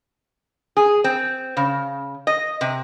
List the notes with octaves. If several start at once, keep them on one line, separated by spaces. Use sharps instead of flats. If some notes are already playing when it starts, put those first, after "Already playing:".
G#4
C4
C#3
D#5
C3